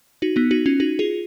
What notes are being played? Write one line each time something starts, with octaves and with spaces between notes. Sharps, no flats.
D#4 F#4
B3 D#4
D#4 F#4
C#4 F4
D#4 F#4
F4 G#4